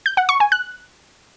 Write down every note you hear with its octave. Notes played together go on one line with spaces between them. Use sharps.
G6
F#5
C#6
G#5
F#6